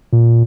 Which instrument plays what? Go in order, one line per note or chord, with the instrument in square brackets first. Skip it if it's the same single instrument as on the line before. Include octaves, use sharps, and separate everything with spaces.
[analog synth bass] A#2